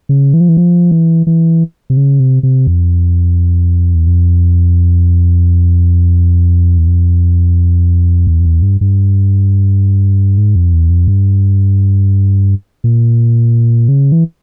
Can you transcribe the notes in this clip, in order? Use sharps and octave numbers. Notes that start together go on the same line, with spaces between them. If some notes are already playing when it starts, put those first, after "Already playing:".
C#3
E3
F3
E3
F3
E3
E3
C3
C#3
C3
C3
F2
E2
F2
E2
F2
E2
F2
E2
G2
G2
G#2
F2
E2
F2
G2
A#2
C#3
E3